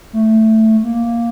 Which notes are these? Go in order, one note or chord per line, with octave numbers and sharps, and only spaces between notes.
A3
A#3